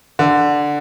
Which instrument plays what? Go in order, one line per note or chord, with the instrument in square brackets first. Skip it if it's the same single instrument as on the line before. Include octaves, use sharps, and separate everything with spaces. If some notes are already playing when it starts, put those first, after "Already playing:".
[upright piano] D3